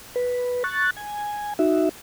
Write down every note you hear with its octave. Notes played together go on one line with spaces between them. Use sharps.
B4
C#6 F#6 A6
G#5
D#4 F#4 E5